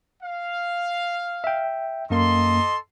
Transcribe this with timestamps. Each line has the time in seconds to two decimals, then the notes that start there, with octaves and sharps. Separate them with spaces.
0.23 F5
1.44 E5 G5
2.10 F#2 A#3 A4 D#5 C6